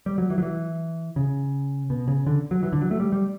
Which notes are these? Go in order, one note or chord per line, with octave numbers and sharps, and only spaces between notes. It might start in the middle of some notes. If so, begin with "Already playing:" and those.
G3
F#3
E3
F#3
E3
C#3
B2
C#3
D3
F#3
E3
D3
F#3
A3
G3
G3